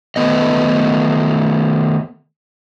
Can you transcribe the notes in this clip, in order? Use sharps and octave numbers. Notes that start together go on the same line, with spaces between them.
D#3 A3 B3 D#5